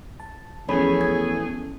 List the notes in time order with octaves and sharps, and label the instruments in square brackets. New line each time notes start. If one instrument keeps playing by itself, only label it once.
[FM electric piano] A5
[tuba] E2 [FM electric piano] F3 C#4 [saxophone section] A3 G#4 [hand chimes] C#5 B5
[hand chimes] G#6